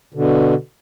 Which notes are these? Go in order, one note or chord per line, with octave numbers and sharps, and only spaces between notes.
B2 D3